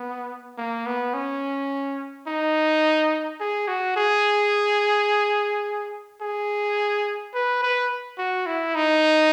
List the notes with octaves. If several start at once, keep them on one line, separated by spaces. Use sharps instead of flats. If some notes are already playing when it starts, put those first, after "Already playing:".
Already playing: B3
A#3
B3
C#4
D#4
G#4
F#4
G#4
G#4
B4
B4
F#4
E4
D#4